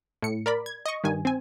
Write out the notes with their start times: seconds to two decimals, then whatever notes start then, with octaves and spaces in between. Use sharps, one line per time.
0.22 A2 C#7
0.46 A#4 D5 B5
0.66 G#6
0.86 D#5 C#6
1.04 G2 D#3 G#5
1.25 C4 G#5